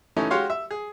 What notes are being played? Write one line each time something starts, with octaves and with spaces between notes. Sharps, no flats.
E3 A3 C#4 D#4 E4
G#3 F#4 G4 C#5 F5 C6
E5
G#4